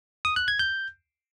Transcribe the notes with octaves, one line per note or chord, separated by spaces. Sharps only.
D#6
F#6
G#6
G6